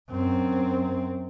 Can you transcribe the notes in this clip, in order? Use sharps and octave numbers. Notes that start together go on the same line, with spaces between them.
F#2 C4